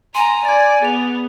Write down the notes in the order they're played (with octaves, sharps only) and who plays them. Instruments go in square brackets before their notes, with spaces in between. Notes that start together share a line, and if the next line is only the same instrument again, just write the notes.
[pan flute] G#5 [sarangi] A#5 [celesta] C6
[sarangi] D5 [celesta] G#6 A6
[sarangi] B3 [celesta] G#4 F7